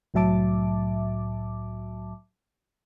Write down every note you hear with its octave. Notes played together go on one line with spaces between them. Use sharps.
C2 A2 F#3 E5 A5 D6